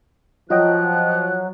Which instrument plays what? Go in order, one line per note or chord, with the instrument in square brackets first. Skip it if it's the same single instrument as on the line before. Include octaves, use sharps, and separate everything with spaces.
[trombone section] F3 [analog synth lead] F#3 [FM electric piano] F4 D#5 G5 [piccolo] F#6